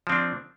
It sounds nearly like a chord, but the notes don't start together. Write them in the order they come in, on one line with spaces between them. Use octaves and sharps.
F3 C4 D4